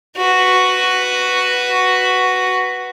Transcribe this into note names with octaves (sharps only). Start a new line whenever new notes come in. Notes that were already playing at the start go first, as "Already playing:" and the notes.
F#4 B4